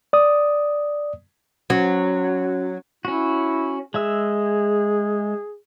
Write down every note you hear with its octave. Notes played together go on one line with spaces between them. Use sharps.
D5 D#6
F#3 C#4 F#4
C#4 E4 F#4
G#3 G#4 E5 E6